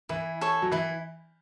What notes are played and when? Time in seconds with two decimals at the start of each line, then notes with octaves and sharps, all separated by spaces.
0.09 E3 E4
0.41 A4 C#5
0.62 F#3
0.72 E3 E4